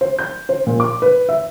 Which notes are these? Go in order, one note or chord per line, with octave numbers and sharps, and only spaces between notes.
C5
G6
C5
A#2
D6
B4
E5